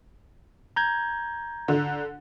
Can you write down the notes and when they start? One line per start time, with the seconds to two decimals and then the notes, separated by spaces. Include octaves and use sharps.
0.76 A#5 G6 G#6
1.68 D3